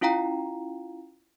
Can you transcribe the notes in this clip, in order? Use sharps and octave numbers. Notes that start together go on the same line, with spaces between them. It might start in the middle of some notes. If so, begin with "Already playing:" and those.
C#4 E4 F4 F5 G5 A#5